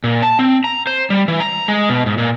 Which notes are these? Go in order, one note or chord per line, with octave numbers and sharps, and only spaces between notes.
A#2
A5
C4
A#5
C5
G3
E3
A#5
G#3
B2
G#2
A#2